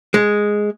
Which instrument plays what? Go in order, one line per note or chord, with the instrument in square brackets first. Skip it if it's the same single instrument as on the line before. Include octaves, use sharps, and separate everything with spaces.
[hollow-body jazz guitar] G#3